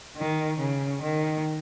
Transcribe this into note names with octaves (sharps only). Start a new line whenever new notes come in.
D#3
C#3
D#3